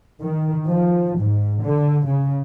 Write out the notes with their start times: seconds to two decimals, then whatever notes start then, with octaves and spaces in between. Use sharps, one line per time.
0.21 D#3
0.68 F3
1.19 G#2
1.63 D3
2.07 C#3